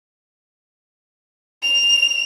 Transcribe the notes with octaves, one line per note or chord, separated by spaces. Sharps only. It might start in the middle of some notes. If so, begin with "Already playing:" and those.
F7